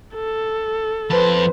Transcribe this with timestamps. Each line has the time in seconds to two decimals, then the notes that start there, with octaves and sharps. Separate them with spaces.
0.15 A4
1.10 F2 B4 C5 A5